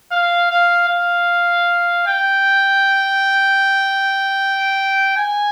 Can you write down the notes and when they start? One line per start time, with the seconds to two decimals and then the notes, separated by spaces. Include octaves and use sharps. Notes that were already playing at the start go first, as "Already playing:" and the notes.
0.12 F5
0.51 F5
0.89 F5
2.06 G5
5.17 G#5